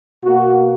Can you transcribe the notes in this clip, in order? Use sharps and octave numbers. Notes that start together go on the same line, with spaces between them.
B2 A#3 F#4